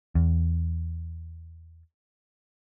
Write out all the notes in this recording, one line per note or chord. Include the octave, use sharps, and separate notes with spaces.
E2